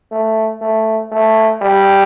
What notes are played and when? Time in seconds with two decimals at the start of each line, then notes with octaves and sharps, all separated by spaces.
0.12 A3
0.61 A3
1.11 A3
1.62 G3